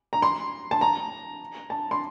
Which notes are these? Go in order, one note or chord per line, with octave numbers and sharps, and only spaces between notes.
A#5
C6
A5
A#5
A5
C6